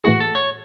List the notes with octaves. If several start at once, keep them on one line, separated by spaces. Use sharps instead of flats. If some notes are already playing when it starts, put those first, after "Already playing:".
A2 E3 A3 E4 F#4 G#4
A4
C#5